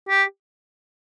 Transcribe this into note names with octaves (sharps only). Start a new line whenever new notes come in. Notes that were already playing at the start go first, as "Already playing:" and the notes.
G4